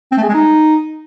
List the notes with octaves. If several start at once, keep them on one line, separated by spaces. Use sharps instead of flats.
C4
A3
G#4
G#3
D#4